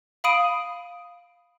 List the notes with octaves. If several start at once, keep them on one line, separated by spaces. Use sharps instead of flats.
F5 B5 D#6 D7 D#7